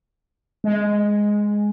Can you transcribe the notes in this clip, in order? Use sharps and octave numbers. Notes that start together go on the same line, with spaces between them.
G#3